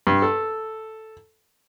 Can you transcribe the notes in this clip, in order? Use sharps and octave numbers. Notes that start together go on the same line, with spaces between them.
G2
A4